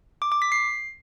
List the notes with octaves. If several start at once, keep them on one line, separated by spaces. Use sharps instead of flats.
D6
D6
B6
C7